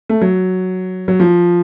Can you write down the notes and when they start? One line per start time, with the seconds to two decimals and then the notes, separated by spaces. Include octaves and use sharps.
0.09 A3
0.21 F#3
1.08 F#3
1.20 F3